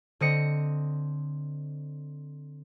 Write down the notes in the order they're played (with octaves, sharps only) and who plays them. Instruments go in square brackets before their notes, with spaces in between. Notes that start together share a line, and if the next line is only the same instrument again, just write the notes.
[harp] D3 C4 D#5 C#7